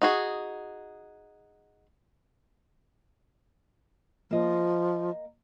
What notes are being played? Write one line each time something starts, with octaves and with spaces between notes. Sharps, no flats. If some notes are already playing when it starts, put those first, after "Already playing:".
D#4 F#4 G#4
F3 A#3 D#5